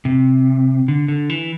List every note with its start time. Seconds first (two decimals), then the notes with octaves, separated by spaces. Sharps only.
0.05 C3
0.88 D3
1.08 D3
1.30 E3